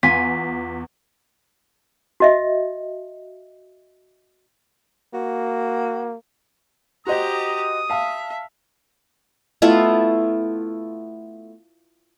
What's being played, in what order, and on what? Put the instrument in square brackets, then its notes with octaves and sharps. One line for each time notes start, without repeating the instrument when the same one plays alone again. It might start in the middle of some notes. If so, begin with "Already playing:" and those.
[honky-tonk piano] E2 [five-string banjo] F4 G#5 [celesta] B6
[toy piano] F#4 D#5 E5
[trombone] A#3 [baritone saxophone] F#4
[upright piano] F#4 C5 D#5 [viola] G4 A#5 [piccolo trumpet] D#6
[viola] E5 [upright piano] F5 A5
[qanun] A3 B3 E4 F4